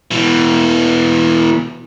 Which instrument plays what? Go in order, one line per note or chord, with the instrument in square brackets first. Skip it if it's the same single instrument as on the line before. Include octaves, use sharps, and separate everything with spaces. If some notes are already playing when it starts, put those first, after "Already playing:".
[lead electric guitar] B2 E3